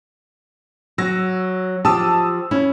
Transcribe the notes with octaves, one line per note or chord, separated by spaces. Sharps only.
F#3 E6 A#6
F3 G4 A5 D#6 E6
C#4 E4